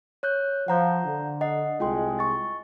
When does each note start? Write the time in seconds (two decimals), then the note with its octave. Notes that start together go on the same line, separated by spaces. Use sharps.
0.23 C#5 F#6 G6
0.68 F3 F#5 A#5 G6
1.05 D3
1.41 D#5 F#5 C7
1.80 C2 G#3 F4 G5 C6
2.19 C#6 A6